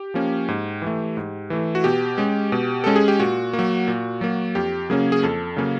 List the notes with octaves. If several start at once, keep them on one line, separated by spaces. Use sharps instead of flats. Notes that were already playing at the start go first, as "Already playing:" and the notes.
Already playing: G4
F3 A#3 C#4
G#2
E3 A3
G#2
E3 A3
F#4
B2 G4
G#3 C#4
B2
G#3 C#4 A4
G#4
G4
A#2 F#4
A#3
F#3
A#2
F#3 A#3
F2 G4
C#3 F#3 A#3 C#4 G#4
G#4
F2 A4
C#3 F#3 A#3 C#4